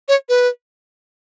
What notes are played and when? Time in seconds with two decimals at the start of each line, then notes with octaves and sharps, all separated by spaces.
0.09 C#5
0.29 B4